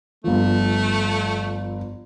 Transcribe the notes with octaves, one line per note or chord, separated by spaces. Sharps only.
G1 F3 A3